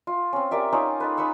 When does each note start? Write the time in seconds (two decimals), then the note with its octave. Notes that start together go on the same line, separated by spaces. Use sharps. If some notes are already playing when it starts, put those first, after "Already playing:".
0.07 F4
0.33 C4 C#4
0.51 G4 A#4 D5 E5
0.73 C#4 D#4 F4
1.00 D#4 A4 B4
1.17 D#4 B4 C#6 E6